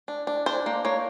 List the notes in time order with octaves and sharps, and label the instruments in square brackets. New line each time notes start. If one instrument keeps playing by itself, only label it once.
[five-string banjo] D4
D4
D4 C5
A#3
A#3 C#5